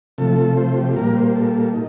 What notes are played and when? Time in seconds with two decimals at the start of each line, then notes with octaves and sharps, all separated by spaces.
0.18 C3 F3 A3 A4
0.57 C5
0.77 G4
0.96 A#2 G3 A#3 A#4
1.16 C5
1.35 A4
1.74 D#4